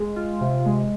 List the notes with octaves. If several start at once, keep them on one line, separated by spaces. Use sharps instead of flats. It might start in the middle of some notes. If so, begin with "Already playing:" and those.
Already playing: G#3
F4
C3
G#3